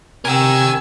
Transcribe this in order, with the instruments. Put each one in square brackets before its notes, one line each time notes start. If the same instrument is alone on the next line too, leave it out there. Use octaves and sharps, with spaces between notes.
[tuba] C3 [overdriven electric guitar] A#4 G5 [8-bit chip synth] G#5 E6